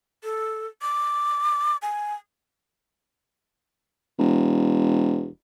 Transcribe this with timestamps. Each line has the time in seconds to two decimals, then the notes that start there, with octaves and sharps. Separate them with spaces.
0.23 A4
0.82 D6
1.82 G#5
4.19 E1